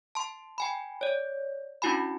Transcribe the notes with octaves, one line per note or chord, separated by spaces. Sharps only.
A5 C6
G5 G#5 B5
C#5 D5
C#4 D4 E4 F#4 G#5 B5